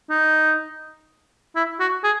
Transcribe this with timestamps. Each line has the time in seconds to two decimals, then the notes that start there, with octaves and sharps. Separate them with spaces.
0.10 D#4
1.55 E4
1.80 F#4
2.04 G#4